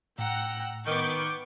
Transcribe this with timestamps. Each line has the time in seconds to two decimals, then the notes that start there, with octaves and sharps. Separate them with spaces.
0.19 A2 F#5 G5 A#5 E6
0.86 D#3 B3 C#6 D6 G6